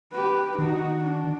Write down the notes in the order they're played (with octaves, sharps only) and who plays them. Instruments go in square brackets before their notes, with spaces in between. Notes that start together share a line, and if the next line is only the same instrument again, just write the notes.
[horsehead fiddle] G4 B4
[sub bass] D#3 [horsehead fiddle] D#4 F#4
[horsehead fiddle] D4